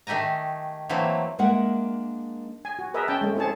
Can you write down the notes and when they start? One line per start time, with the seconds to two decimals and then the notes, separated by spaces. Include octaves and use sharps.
0.07 D#3 A3 G4 G#5 A#5
0.89 E3 F#3 A3 A#3 C4
1.39 G#3 A#3 D4 A#4 E5 F#5
2.65 G#5
2.79 F#4
2.94 G#4 A#4 B4 D#5 E5
3.07 C#4 G5 A5
3.21 G#3 A3 C#4
3.36 C4 E4 G#4 C#5 A5